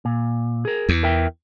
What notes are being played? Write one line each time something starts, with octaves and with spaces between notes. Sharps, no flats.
A#2
G#4 A#4
E2
A#4 E5 G5